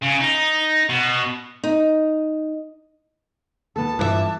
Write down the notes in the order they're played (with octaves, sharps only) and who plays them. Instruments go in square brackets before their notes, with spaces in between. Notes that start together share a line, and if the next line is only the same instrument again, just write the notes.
[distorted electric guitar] C#3
D#4
B2
[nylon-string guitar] D#4
[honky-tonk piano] D#2 A#2 [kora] B3 A4 [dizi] A5
[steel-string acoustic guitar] G2 B4 E5 [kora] E3 [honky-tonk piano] F4 D6 F#6